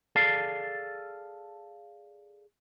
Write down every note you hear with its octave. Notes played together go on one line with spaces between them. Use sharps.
G#4 A4 D5 F5